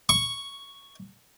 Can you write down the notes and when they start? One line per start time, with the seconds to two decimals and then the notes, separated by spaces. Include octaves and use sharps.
0.09 C#6